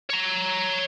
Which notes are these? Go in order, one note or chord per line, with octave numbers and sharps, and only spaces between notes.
C#5 A#5